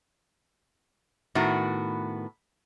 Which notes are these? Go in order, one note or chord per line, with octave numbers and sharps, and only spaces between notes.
A2 D#3 B3 F#4